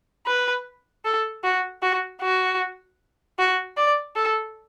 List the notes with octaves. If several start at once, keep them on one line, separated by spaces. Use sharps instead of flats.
B4
A4
F#4
F#4
F#4
F#4
D5
A4